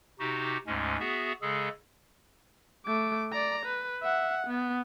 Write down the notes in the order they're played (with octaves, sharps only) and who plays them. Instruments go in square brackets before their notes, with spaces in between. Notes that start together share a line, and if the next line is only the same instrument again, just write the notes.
[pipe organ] C3 D#4 F#4 G4
D2 G#2 G#3 C#4
B3 F#4 G#4 E5
C#3 G#3 G#4 A4
[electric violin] A3 D6
D5 A#5
B4
E5 F#5
B3